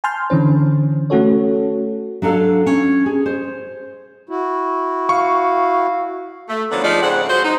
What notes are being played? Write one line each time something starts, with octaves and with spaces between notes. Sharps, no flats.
G#5 A5 C6 F6 G6
D3 E3 C#4 C5
A3 C#4 F#4 A4 C#5
F#3 D4 A4 F5
C#4
G#4
C5
E4 F#4
F5 C#6
A3
D3 D#3 F3 F#3 B3 D4
F3 G#3 A3 D#4 D5
G#2 C#3 C4 F#5
F#3 F#4 G#4 C5
D#4